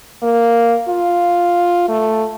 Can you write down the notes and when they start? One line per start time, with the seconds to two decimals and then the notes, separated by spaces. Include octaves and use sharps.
0.23 A#3
0.88 F4
1.88 A3